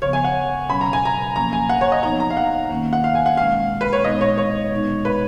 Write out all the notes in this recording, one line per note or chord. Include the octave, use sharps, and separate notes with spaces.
C#3 F3 B3 C#5
G#5
F#5
B2 F#3 C#4 B5
A#5
G#5
A#5
F3 A#3 C#4 A#5
G#5
F#5
C#5
D#5
F3 B3 D#4 A#5
A#5
F5
F#5
D#3 A#3 C#4
F#5
F5
G#5
F#5
B2 G#3 C#4 F5
B4
C#5
A#2 G#3 B3 D#4 D#5
C#5
C#5
B2 G#3 B3 D#4
B4